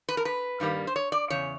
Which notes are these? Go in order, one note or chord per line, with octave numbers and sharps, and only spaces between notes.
B4
A#4
B4
G2 D#3 G3 A#3
C5
C#5
D5
E2 C#3 C#5